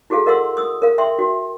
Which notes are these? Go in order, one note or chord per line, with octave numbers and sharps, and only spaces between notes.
E4 F#4 G#4 A4 F5
A#4 D#5 F5 F#5 C6 E6
D#6 E6
A#4 F5
E5 G5 C6
F#4